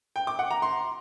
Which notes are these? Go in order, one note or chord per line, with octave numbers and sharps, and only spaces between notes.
G5
D6
F#5
A#5
C6